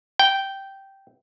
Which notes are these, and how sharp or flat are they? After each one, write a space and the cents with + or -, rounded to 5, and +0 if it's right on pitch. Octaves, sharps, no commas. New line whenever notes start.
G5 -5